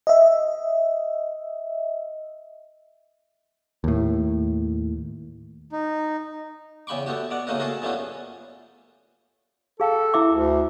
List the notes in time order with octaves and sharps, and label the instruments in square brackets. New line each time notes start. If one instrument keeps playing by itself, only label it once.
[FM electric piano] D#5 E5
[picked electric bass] D#2 A2
[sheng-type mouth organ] D#4
[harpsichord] E2 C#3 G5 B5 C#6 D6
A3 B3 F#4 G4
B2 D5 F#5
A1 C#3 A3 A#3 D#4 F#4
A3 A#3 F#4 G#4 A4
F#2 F3 G3 A3 B3 C#4
[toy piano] G#4 F5 G5 [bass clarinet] A4
[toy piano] E4 E5 D6
[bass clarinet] D2